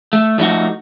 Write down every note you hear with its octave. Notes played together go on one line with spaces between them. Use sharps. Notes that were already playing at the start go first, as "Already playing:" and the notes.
A3
F3 F#3 A3 D#4 F#4